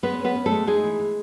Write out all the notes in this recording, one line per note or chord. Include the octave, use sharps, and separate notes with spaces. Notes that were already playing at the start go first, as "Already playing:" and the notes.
G#3 B3 B4
C#4
B3 B4
C#4
A3 A4
G#3
G#3 D#4 G#4
E3
E3